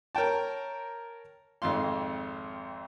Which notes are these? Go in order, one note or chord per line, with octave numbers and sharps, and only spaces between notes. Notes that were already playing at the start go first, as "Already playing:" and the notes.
A#4 C#5 G5 A5
G#1 F2 F5 C6